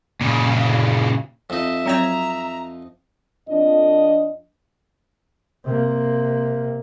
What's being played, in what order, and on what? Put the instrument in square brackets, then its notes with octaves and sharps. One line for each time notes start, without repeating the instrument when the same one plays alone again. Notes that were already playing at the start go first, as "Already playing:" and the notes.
[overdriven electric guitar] A#2 C#3
[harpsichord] F2 D#4 [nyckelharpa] E5
[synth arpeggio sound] F#3 C4 C#5 [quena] A#5
[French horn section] F2 D4 D#5
[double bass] C3 A#3